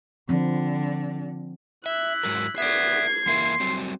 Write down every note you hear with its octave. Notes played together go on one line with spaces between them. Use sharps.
D3 F3 C4
E4 E5 F#6
G#2 F#3 A#4
B3 D5 E5 G#6 C7
E2 A#3 E4 C6
F#3 G3 C4